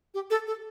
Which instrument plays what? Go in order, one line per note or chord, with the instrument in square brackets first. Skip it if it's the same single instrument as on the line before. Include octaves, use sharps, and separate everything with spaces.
[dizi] G4
A4
A4